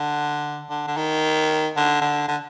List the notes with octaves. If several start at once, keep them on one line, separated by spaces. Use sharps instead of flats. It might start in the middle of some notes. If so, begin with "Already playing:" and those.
Already playing: D3
D3
D3
D#3
D3
D3
D3